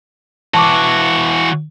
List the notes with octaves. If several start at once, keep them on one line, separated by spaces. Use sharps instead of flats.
E3 F#4 A5 C#6 D6